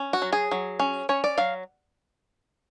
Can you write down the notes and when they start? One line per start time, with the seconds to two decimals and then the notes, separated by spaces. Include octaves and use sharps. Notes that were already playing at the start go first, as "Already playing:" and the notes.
Already playing: C#4
0.13 F#4
0.22 F#3
0.33 G#4
0.51 F#3
0.80 C#4
1.09 C#4 C#5
1.24 D5
1.38 F#3 F5